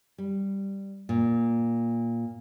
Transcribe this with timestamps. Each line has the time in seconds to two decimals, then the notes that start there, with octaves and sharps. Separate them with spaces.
0.18 G3
1.09 A#2